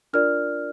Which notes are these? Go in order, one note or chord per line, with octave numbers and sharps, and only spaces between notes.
D4 F4 A#4 D5 F6